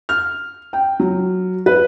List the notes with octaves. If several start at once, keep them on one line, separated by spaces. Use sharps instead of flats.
F6
G5
F#3
B4